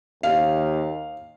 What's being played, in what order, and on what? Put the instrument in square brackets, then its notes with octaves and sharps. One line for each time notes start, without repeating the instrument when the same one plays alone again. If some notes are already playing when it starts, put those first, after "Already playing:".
[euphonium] D#2 [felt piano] F5